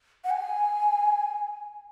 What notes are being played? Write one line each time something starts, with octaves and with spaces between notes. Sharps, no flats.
F#5
G#5